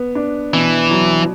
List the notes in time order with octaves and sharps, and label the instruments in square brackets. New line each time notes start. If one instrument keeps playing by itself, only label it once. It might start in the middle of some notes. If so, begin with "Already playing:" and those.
Already playing: [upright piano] B3
D4
[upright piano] B2 [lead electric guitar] E3
[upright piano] F#3